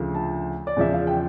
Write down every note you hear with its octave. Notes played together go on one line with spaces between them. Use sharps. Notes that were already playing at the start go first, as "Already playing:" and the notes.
Already playing: D2 C#3 F3
A5
D5
E2 C#3 F3 E5
F5
G5